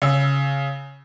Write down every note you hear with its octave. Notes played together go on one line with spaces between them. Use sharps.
C#3 E6